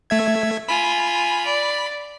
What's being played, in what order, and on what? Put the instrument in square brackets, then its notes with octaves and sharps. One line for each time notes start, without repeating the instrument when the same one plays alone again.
[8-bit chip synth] A3 E5 G#6
[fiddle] F4 G#5 [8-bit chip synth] B5
[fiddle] D5